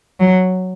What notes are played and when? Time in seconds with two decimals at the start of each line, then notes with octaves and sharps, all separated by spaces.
0.20 F#3